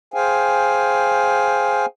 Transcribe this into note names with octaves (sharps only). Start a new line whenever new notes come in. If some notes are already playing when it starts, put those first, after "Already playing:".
G#4 C5 F5 G5 G#5